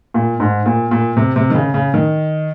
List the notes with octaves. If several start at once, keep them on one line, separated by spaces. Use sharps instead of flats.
A#2
G#2
A#2
A#2
C3
C3
D#3
C#3
C#3
D#3